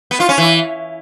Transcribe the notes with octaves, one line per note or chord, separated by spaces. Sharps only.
B3
F4
C#4
E3